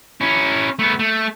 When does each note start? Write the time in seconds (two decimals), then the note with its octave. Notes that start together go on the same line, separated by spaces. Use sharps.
0.21 C#4 E4
0.79 A3 B3
0.99 A3